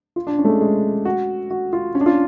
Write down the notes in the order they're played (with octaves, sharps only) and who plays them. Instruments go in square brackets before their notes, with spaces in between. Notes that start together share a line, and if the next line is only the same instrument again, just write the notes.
[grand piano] F4
D4
C#4
A3
G#3
G#3
F#4
F#4
F4
C#4
D4
F4